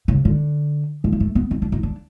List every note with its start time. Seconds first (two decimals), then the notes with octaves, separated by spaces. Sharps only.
0.08 C#3
0.25 D3
1.04 G#3
1.12 A#3
1.20 A3
1.35 B3
1.51 C4
1.62 D4
1.72 D#4
1.83 D4